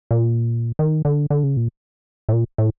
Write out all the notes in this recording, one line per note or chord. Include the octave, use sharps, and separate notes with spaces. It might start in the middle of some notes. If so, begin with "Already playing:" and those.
A#2
D#3
D3
D3
C#3
A#2
A2
A#2
A2